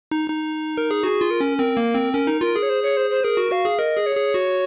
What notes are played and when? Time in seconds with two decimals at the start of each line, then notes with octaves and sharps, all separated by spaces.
0.11 D#4
0.30 D#4
0.78 A#4
0.91 G#4
1.03 F#4 G#4
1.21 F4
1.31 A#4
1.40 C#4
1.58 C4 A#4
1.77 A#3
1.95 C4
2.13 C#4 A#4
2.27 D#4
2.41 F4 A#4
2.56 G#4
2.63 C#5
2.69 C5
2.83 C#5
2.97 C5
3.11 C5
3.24 G#4 A#4
3.37 F#4
3.52 F#4 F5
3.65 G#4
3.79 A#4 D#5
3.97 G#4
4.06 C#5
4.16 G#4
4.34 F#4